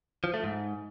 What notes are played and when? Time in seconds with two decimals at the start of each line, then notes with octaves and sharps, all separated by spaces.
0.24 F3
0.34 A3
0.44 G#2